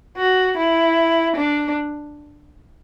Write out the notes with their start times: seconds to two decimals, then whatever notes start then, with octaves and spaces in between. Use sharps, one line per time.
0.17 F#4
0.57 E4
1.36 D4